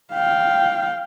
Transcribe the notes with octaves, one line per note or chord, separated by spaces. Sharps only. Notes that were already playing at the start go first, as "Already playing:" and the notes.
F5 G5